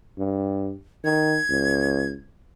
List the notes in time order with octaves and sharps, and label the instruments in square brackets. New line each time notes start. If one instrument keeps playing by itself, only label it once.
[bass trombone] G2
[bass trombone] D#3 [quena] G#6
[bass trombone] C#2